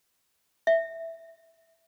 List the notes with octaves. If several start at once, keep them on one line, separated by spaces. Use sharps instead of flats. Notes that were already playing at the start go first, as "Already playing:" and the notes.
E5